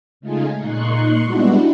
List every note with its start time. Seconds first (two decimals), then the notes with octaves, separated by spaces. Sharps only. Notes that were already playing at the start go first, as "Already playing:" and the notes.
0.20 C#3 G#3 A3 D#4 F4 G#4
0.58 A#2 D#4 C6 C#6 F#6
1.23 G3 G#3 B3 D4 E4 F#4